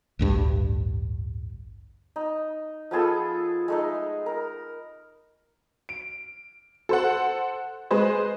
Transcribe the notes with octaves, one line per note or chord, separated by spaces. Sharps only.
A1 D2 G2
D#4
F3 B3 G#4 A4
G#3 A3 D#4
A#4
D7
A4 C5 F#5
G#3 G#4 B4 C5 D#5